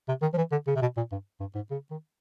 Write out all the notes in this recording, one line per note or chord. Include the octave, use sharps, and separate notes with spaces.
C3
D#3
F3
E3
D3
C#3
C3
B2
A#2
G2
G2
G#2
C#3
D#3